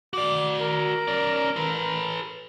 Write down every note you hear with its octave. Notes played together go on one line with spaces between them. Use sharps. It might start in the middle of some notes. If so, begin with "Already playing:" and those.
F#4 D5 D6
A#4
C#4 D5
A4 B4